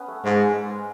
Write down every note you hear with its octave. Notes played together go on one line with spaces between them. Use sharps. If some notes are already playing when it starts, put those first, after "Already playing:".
Already playing: B3 C#4
A3
G#2 G#3